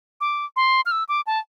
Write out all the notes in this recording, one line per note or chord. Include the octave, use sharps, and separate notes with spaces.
D6
C6
F6
E6
D6
A5